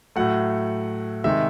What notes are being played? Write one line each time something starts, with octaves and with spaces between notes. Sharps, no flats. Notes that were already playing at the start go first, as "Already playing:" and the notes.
A2 F#3 A3 F#5
C3 D#3 G#3 E5